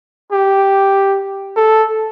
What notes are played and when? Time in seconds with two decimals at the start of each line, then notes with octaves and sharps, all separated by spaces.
0.32 G4
1.56 A4